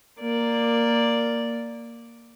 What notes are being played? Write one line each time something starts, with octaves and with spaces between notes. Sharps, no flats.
A#3 D5